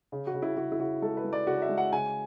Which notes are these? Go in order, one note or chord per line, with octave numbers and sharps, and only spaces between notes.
C#3
F#4
C#3
E4
C#3 F#4
E4
C#3 F#4
G#3 A4
B4
G#3
D5
C#3 F#4
E5
G#3
F#5
C#3 G#5